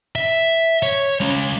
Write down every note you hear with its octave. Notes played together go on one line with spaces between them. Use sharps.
E5
C#5
G#3 C#4